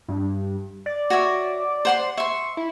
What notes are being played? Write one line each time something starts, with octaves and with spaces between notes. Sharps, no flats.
G2
D5
F#4 C#5 E5
C5 F#5 C6
E5 C6 C#6
E4